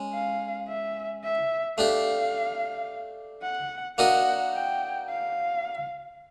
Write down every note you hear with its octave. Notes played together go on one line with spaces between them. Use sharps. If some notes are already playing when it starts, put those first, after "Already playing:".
Already playing: G#3 C#4
F5
E5
E5
A3 D4 G4 F5
F#5
A#3 D4 F#4 A#4 D#5 F#5
G5
F5